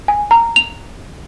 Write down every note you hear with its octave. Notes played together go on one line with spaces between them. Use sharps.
G#5
A#5
F7